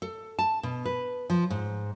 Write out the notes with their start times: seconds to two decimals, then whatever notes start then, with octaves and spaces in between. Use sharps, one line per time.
0.02 A4
0.39 A5
0.63 B2
0.86 B4
1.30 F3
1.50 G#2